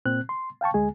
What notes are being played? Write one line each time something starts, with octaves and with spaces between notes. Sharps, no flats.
A#2 C4 F#6
C6
F5 G5 A5 C#6
D2 G#3 G#4 G#5